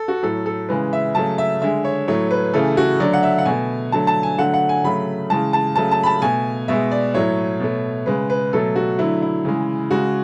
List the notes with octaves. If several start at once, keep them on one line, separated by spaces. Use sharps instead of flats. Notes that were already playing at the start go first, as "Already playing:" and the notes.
Already playing: A4
F#4
A2 F#3 A3 A4
A4
C#3 E3 G#3 B4
E5
C#3 F#3 A3 A5
E5
D3 G#3 E5
C#5
A2 F#3 A3 C#5
B4
C#3 E3 A3 A4
F#4
D3 F#3 A3 D5
F#5
E5
F#5
B2 A3 G#5
D3 F#3 A3 A5
A5
G#5
D3 F#3 A3 F#5
F#5
G#5
C#3 F#3 A3 B5
C#3 E3 G#3 A5
A5
C#3 F#3 A3 A5
A5
B5
A5
B2 A3 G#5
B2 G#3 E5
D5
A2 F#3 A3 C#5
B2 A3
C#3 G#3 B4
B4
B2 F#3 A3 A4
F#4
D3 F#3 A3 E4
E4
C#3 E3 G#3
C#3 G#3 F#4